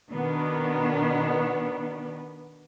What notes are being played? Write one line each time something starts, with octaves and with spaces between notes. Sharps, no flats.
B2 D#3 B3 D4